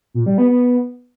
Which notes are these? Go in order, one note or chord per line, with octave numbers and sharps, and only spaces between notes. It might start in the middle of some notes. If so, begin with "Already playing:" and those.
A#2
G3
B3
B3